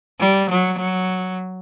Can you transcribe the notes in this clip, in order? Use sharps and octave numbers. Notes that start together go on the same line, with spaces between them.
G3
F#3
F#3